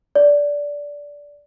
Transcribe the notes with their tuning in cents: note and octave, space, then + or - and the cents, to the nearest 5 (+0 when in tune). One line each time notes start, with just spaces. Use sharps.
D5 -15